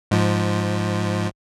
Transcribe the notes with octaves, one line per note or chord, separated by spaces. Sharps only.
G#2 F3